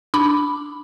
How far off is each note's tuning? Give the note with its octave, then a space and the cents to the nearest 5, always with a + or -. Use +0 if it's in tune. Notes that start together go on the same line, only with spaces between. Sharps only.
D4 +0 B5 +0 D6 +0